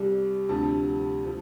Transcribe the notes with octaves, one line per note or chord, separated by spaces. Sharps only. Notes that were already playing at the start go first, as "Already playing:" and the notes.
Already playing: C2 C3 G3
D2 C3 F3 A3 A5
F3 A3